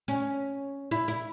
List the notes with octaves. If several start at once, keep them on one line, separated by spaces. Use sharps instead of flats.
C#4
E4
E4